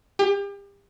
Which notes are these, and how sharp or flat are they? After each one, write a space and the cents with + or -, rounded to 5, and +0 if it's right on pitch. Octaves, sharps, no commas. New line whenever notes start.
G4 +35